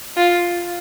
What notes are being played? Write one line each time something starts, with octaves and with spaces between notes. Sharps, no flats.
F4